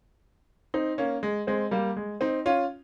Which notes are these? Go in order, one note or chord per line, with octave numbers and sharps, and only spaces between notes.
C4 D#4
A#3 C#4
G#3
G#3 C4
G3 A#3
G#3
C4 D#4
C#4 F4